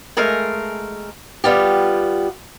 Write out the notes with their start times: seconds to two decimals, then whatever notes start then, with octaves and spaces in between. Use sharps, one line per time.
0.17 G#3 A3 A#4 F5
1.44 G3 B3 F4 G4